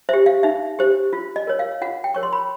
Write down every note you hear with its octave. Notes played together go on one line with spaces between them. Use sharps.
G4 C5 E5
F5
D#4 E5
G4 C5
F4
D#5
A#4 C#5
F5
F4 F#5
G5
A#4 C#5 C#6
C6
B5